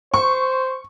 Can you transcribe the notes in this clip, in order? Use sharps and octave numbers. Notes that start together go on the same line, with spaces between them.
C5 C#6